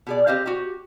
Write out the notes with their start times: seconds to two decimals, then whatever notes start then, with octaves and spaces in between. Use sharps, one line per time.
0.07 B2 G#4 D5
0.27 C4 G4 C5 D#5 F5
0.46 F#4 G4